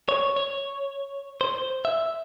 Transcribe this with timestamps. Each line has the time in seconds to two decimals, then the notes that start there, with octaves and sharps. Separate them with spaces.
0.09 C#5
0.36 C#5
1.41 C5
1.85 E5